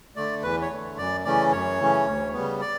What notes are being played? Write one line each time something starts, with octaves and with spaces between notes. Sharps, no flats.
D3 A3 D5
E2 B4
C#5
D3 A3
F#2 D5
C#3 E3 A3 C#4 D5
F#2 C#5
C#3 E3 A3 C#4
D2
C#3 G3 B3
D5